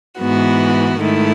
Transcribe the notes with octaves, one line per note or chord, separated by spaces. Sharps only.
G#2 E3 B3 F#4
G#2 D#3 A3 E4